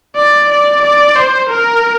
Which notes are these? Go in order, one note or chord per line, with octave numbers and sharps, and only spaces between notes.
D5
D5
D5
C5
A#4